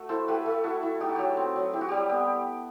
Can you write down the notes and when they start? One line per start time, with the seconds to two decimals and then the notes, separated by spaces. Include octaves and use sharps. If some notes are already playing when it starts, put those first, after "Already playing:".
Already playing: A3 F#4
0.09 E4 A4 C5
0.28 A3 G4 B4
0.46 A3
0.64 E4 F#4 A4
0.83 E4
1.00 D#4 G4
1.09 F#4
1.16 F#3 G4
1.37 C4
1.56 F#3
1.73 E4 G4
1.81 F#4
1.88 G3 G4
2.09 B3